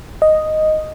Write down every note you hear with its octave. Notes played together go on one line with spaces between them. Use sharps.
D#5